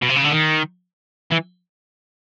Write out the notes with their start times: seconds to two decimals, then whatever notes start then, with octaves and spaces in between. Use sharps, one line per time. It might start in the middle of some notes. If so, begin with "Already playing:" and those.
0.02 B2
0.09 C3
0.16 C#3
0.24 D3
0.31 D#3
1.32 E3